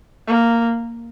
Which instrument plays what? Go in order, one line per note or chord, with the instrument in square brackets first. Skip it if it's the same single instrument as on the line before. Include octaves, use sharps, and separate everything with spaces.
[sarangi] A#3